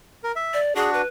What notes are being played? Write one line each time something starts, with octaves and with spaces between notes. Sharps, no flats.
A#4
E5
D5
D4 F#4 G#4
B4